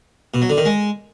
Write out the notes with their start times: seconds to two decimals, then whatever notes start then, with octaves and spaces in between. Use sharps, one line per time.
0.34 B2
0.42 F#3
0.50 D3
0.57 D#3
0.65 G#3